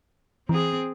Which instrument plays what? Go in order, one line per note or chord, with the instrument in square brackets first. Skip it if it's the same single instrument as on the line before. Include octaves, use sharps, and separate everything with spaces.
[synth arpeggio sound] E3 [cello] C4 G#4